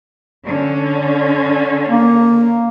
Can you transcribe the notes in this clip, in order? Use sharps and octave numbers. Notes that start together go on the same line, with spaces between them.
D3 C#4
A#3